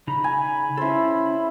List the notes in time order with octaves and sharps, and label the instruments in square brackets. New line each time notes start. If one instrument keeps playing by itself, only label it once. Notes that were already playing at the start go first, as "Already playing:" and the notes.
[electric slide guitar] C#3 D#4 A#5 [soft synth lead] B5
[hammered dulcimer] G#5
[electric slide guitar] C#4 A4 [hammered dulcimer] E4 C5